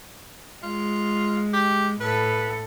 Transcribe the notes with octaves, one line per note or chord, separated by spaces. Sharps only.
G#3 F4
G4
A2 A4 B4